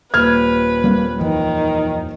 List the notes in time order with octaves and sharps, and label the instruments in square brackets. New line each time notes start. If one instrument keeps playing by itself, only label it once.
[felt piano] D#1 F6 G#6 [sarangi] B4
[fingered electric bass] G3 A#3 C4
[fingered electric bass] F2 E3 [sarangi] D#3